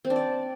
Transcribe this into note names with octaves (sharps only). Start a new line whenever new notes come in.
C4
D4
D5